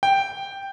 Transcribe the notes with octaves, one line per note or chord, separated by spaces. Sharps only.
G5